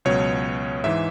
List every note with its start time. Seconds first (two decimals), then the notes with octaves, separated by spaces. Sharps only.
0.05 C#2 B2 F#3 C#5
0.84 G#2 E3 G#3 E5